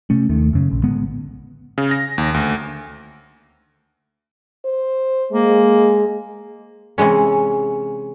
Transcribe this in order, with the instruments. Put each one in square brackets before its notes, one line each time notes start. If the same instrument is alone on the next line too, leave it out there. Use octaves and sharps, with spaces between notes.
[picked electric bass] C3 A3 C#4
D#2 D#3 A3
F#2 C#3
A#1
A2 D3 G#3 B3
[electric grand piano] C#3
A#6
D#2
D2
[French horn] C5
[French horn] G#3 [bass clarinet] A#3
[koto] C3 E3 G#3 C#4